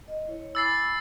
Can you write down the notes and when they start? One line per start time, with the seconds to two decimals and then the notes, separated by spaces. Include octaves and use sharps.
0.08 D#5
0.28 E4 C#5
0.55 G#5 B5 D6 E6 A6 C7